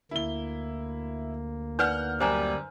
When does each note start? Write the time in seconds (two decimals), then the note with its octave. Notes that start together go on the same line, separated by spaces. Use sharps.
0.11 D2 A#3 E4 G7
1.79 D#4 B4 D5 F#5 F6 G6
2.20 F#2 G3 C5 G#5 A#5